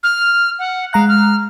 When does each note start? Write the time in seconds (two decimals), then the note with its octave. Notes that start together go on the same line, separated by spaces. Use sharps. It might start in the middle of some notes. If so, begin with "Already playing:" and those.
0.03 F6
0.59 F#5
0.93 G#3 F5 A#5 F#6
1.09 F6